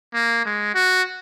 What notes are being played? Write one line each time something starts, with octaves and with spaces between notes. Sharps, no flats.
A#3
G#3
F#4